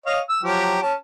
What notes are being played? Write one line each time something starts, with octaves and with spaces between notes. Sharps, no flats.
C#5 D#5 F5
E6
F3 F#3 G4
C#4 A5